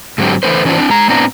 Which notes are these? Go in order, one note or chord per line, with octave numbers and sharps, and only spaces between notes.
G#2 D3 F#3 C4 G4
D3 E3 A3 C#4 B4 C5
E3 C#4 D4 F4 C5
C4 D4
G#3 A#5
A2 B3 C4 D4 A#5